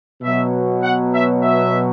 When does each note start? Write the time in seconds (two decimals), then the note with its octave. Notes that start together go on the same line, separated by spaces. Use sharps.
0.21 B2 F#3 E5
0.82 F#5
1.13 E5
1.42 E5